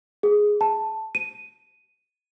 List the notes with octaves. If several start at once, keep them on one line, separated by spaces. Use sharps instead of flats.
G#4
A5
D#7